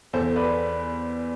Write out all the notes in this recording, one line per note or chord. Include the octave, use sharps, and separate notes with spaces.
E2 A4 C5
B4 D5